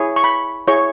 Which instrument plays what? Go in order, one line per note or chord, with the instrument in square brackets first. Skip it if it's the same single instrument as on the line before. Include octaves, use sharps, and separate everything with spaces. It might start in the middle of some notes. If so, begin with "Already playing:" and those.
Already playing: [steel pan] E4 G#4 C#5
C#6
B5
E4 G#4 C#5 C#6